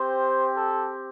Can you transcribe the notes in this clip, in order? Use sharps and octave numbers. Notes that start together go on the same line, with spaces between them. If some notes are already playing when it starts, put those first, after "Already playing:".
Already playing: C4 G4 C5
A4